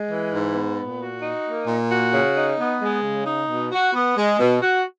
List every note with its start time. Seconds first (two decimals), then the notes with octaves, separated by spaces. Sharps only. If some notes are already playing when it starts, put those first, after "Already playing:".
Already playing: G#3
0.09 E3
0.32 G#2
0.54 B3
0.78 A#2
1.00 F#4
1.22 D#4
1.44 A#3
1.67 A#2
1.89 F#4
2.13 C#3
2.35 D#4
2.59 B3
2.81 G#3
3.03 C#3
3.25 D#4
3.48 B2
3.72 F#4
3.93 B3
4.17 G#3
4.39 B2
4.61 F#4